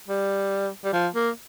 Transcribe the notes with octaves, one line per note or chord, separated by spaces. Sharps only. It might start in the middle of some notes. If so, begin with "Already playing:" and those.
G3
G3
F3
A#3